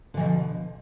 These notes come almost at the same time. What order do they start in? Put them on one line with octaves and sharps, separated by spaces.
D3 E3 B2 F3